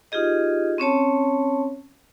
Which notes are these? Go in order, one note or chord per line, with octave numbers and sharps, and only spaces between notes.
D#4 F4 G4 G#4 D#5
C4 C#4 C#5 A5